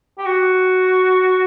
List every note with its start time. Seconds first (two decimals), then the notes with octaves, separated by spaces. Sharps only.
0.18 G4
0.26 F#4